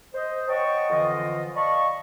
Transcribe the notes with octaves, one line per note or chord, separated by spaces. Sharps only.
C5 D#5
C#5 D#5 F#5 G5 A5 C#6
F2 D3 E3 F3 F4 D#5
D5 D#5 F5 A5 B5 C#6